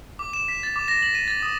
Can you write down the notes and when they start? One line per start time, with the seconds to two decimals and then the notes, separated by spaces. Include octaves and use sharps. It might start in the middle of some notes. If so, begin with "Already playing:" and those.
0.19 D6
0.33 E7
0.48 B6
0.63 A6
0.76 D6
0.88 A#6
1.03 F#7
1.15 D#7
1.28 A6
1.43 D#6